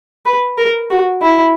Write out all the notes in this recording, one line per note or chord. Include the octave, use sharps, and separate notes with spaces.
B4
A#4
F#4
E4